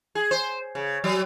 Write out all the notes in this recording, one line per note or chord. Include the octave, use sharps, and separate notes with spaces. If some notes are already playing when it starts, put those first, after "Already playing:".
G#4
C5
C#3
F#3